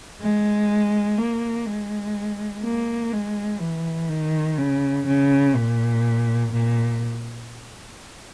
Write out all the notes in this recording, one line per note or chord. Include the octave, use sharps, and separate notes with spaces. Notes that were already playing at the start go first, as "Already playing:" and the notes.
G#3
A#3
G#3
A#3
G#3
E3
D#3
C#3
C#3
A#2
A#2